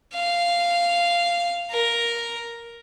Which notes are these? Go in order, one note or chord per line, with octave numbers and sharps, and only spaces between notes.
F5
A#4